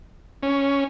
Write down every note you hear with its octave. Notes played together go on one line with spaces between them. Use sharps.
C#4